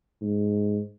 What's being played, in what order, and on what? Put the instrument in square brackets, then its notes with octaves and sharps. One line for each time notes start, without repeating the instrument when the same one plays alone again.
[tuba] G#2